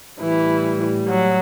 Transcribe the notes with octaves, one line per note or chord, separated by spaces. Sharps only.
A2 E3 G3 E4
F#3 F#4